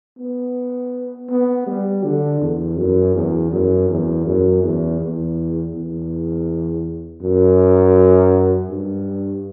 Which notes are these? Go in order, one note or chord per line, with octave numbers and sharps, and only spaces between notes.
B3
B3
G3
D3
E2
F#2
E2
F#2
E2
F#2
E2
E2
E2
F#2
G2